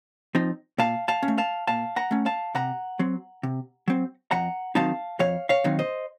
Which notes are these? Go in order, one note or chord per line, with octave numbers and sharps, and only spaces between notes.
F3 C4 D#4
A#2 F5 A5
F5 A5
C#4
A3
F5 A5
A#2 F5 A5
F#5 A#5
A3 C#4
F5 A5
C3 F#5 A#5
F#3 C4
C3
F#3 C4
F2 F#5 A#5
D#3 F#3 C4 D#4 F5 A5
F2 C#5 F5
C#5 F5
D#3 F#3 C4 D#4
C5 D#5